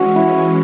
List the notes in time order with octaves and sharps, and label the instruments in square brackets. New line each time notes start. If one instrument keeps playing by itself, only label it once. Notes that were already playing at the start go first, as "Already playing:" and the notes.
Already playing: [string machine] E3 G#3 C#4 [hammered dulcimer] F#4
[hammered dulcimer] E4